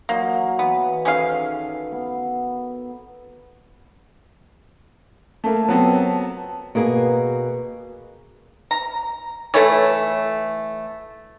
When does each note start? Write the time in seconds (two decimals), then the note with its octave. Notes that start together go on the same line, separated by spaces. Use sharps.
0.09 F#3 A#3 D#5
0.59 E3 B3
1.05 D#3 C#4 G#4 A4 F5
1.92 B3
5.44 A3 A#3 A5
5.68 F#3 B3 C4
6.75 B2 A#3 G#4
8.71 A#5
9.54 E3 A3 E4 A4 C#5